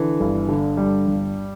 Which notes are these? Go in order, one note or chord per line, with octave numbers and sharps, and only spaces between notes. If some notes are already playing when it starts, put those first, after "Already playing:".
Already playing: D3 E3
G1
D3
G2 G3
G1